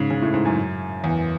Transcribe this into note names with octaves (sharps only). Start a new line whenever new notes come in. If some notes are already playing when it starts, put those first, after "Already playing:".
Already playing: G#2 C#3
C#3
A2
G#2
F#2
E2